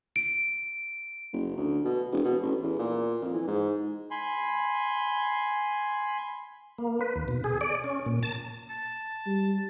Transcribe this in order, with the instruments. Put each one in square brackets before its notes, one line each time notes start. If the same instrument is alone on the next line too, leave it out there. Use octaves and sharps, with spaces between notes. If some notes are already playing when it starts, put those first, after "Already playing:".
[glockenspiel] D7
[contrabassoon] F#1
D2
B2
E1
B2
A1
E2
A#2
F2
E3
G#2
[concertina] G#5 B5 C6
[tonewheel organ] A#3
B4
D#2
B2
G#4
D5
C#4
A#2
A5
[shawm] A5
[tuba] G3